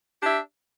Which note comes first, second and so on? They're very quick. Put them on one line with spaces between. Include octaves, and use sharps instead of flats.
D4 G4 E5